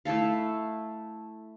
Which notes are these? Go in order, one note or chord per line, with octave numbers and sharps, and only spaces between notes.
A3 E4 A4 F5